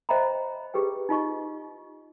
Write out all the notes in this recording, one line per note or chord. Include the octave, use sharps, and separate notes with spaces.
C5 D#5 E5 G5 A#5 B5
G4 G#4 B4 G5
D#4 F4 D#5 C#6